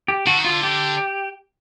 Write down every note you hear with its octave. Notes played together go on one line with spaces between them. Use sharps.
G4
D3 F#4
D#3
D3 F4
G4